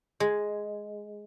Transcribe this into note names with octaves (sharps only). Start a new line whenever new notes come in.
G#3